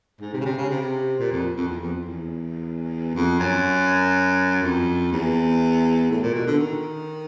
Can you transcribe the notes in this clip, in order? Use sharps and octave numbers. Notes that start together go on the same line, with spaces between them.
G#2
C3
C#3
C3
C#3
C3
A#2
F2
F2
E2
F2
E2
F2
F#2
F2
E2
A2
A#2
B2
D3
D#3